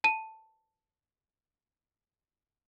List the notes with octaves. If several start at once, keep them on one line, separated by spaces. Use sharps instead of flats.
A5 D#7